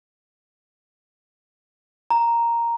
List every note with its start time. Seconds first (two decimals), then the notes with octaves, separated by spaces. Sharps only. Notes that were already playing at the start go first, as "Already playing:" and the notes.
2.10 A#5